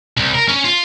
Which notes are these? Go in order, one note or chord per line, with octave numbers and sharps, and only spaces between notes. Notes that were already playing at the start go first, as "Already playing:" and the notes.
C2
A#4
C#4
F4